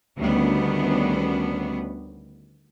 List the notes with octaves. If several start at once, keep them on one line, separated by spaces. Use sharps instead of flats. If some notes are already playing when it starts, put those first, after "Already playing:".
D2 D#3 G3 B3 C#4 D4